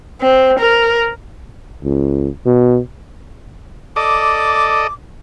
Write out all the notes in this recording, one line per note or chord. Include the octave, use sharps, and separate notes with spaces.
C4
A#4
C#2
B2
A4 D5 D#5 D6